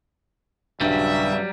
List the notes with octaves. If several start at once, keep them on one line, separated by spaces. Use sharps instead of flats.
D#1 G2 C#3 F#3 G3 D4 F#4 E5